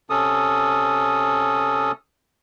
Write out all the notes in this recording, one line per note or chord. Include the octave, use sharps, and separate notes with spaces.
C3 C#4 A4 D#6